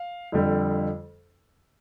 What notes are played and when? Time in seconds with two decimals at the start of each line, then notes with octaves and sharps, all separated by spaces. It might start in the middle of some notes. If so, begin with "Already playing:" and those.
Already playing: F5
0.32 F2 D3 G3